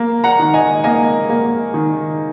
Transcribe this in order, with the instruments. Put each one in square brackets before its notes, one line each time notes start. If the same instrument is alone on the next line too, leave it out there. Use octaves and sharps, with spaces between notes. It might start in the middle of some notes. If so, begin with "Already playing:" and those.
Already playing: [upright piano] A#3
F#5 A#5
D#3
D#5 G#5
A#3 D#5 G#5
A#3
D#3